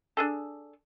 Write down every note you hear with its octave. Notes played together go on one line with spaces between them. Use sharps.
D4 G#4 A4